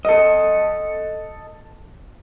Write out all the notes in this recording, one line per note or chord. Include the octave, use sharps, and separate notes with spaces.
A4 D#5